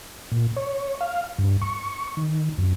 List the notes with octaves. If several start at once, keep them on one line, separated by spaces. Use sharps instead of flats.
A#2
C#5
F5
G2
C#6
D#3
F#2